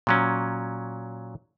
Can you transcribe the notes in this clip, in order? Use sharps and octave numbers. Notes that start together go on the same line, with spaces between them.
A#2 F#3 C#4